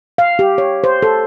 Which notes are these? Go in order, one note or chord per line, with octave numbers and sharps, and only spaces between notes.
F5
G4
C#5
C5
A4